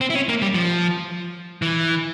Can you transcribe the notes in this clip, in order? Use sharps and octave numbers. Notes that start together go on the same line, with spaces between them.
C4
E4
C#4
A#3
G3
F3
E3